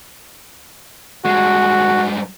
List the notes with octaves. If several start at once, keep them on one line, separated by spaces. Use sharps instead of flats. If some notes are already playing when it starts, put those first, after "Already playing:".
G2 G#3 F#4